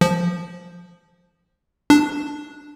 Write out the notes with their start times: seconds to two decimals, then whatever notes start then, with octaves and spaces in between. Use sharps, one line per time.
0.01 F3
1.90 D4